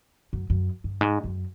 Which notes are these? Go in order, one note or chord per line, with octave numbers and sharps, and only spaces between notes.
F#2
F#2
G2
G#2
F#2